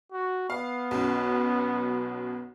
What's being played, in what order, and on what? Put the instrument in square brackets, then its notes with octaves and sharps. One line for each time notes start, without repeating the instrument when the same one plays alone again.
[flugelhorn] F#4
[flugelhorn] B3 [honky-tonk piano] F5
[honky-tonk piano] B1 F#2 B2